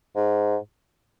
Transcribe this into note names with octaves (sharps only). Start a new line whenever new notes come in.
G#2